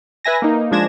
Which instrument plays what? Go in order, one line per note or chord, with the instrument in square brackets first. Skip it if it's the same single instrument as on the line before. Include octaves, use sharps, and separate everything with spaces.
[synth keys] B4 E5 G#5 A#6
A#3 D#4
F3 G#3 D4 G#6 A#6 E7